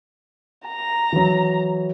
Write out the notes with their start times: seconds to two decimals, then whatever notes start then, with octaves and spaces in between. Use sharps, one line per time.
0.67 A#5
1.13 E3 F#3